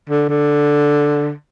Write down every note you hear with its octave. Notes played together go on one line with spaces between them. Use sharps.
D3
D3